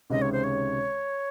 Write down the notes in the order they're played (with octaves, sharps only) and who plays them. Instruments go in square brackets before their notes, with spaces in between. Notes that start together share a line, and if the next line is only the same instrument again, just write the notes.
[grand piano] C#2 C3 D#3 G#3 C#4 [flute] D#5
[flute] C#5
C5
C#5